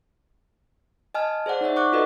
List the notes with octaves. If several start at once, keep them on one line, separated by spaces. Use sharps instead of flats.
D#5 G#5 A5 F6
G#4 C5 D5 F#5
D#4 C#5 D5 E5
F#5 C#6 D6 F#6
F4 F#4 A4 B4 D#5 E5